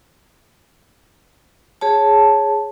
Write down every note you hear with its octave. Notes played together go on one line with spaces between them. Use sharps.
G#4 C#5 A5